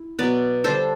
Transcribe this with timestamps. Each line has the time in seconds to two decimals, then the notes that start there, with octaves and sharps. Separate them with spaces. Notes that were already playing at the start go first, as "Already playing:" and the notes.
Already playing: E4
0.19 B2 F#3 B3 B4 D5
0.64 D3 G3 D4 A4 C5